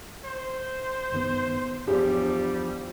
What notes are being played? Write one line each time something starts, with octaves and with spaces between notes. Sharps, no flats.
C5
G2 D#3 B3
E2 F3 G3 D4 G4